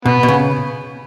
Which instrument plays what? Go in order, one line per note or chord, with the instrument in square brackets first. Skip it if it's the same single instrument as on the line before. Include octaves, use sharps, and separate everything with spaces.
[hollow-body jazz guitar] B2 [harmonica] B3
[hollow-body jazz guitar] B2
C#3